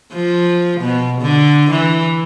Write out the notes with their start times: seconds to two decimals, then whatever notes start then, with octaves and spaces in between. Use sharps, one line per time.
0.13 F3
0.81 B2
1.22 D3
1.71 E3